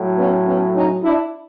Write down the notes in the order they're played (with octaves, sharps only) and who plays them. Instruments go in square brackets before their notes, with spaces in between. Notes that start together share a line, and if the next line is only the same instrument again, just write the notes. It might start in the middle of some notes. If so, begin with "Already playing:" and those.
Already playing: [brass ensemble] A2 F#3
B3 C#4
B3 C#4
C#4 D#4
D4 E4